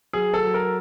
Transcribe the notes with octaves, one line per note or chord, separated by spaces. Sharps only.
F#3 G#4
A4
F#3
A#4